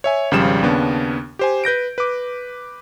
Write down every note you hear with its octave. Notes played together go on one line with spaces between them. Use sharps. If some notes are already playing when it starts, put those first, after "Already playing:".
C#5 E5 G#5
G#1 C#3 F3 G3 F4 E7
D#2 C#3 B3 D4
G4 C5 G#5
B4 G6 A#6 D7
B4 D6